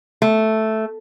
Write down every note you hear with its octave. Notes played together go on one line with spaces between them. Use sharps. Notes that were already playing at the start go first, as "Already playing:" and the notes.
A3